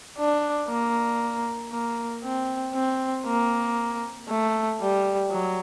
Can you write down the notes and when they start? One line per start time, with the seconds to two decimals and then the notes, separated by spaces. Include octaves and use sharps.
0.18 D4
0.69 A#3
1.72 A#3
2.24 C4
2.74 C4
3.26 A#3
4.29 A3
4.81 G3
5.31 F#3